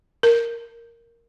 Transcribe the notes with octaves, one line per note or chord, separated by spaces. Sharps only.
A#4